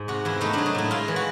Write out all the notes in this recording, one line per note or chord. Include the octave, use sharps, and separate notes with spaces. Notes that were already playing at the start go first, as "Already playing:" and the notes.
Already playing: G#2
C3 F#4
E2 E4
A3 D#4
F#3 D4
D#4
A2 E4
G#3 F4
E3
F#4